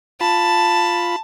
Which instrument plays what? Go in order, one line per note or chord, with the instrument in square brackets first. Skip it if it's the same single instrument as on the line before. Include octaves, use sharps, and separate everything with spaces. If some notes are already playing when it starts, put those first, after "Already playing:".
[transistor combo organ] F4 B5 [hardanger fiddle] A5